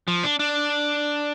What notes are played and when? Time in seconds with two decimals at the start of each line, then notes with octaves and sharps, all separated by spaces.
0.08 F3
0.24 D4
0.39 D4